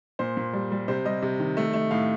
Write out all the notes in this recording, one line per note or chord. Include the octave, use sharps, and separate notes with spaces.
A#2 C5
A#2
G3
G3
C3 C5
G3 D#5
C3
D#3
A3
A3
A2 F5